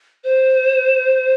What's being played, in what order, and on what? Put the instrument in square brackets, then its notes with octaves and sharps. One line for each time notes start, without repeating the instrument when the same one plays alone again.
[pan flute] C5